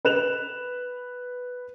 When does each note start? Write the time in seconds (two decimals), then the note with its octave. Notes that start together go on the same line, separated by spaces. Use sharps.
0.05 B4 F#6 E7 F7